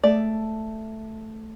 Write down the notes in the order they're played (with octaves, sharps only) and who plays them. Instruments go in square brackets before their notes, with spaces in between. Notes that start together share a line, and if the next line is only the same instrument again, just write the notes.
[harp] A3 A4 [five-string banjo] D5